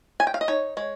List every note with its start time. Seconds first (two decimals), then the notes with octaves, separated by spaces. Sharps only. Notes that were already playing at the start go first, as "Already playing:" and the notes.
0.20 G#5
0.27 G5
0.34 F5
0.41 D#5
0.48 D#4 C#5
0.77 G#3 C#5